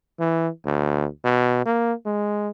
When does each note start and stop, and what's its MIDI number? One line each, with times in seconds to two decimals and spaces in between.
0.20 0.48 52
0.65 1.07 38
1.24 1.61 47
1.66 1.93 58
2.06 2.49 56